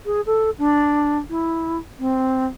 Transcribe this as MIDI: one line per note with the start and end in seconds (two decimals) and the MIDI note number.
0.05 0.21 68
0.26 0.50 69
0.58 1.17 62
1.29 1.78 64
1.99 2.46 60